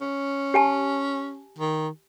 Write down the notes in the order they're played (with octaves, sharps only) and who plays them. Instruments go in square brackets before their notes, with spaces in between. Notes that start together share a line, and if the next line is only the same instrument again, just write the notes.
[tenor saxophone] C#4
[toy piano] G4 G#5 A5
[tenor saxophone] D#3